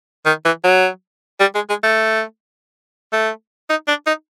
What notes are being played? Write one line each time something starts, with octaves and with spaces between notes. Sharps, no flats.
D#3
E3
F#3
G3
G#3
G#3
A3
A3
D#4
D4
D#4